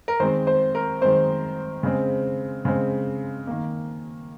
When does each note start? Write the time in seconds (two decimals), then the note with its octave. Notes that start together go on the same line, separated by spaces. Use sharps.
0.08 A#4
0.20 D#3 G#3 C4 C5
0.47 C5
0.75 A#4
1.01 D#3 G#3 C4 C5
1.83 C#3 G#3 C4
2.65 C#3 G#3 C4
3.47 D#3 A#3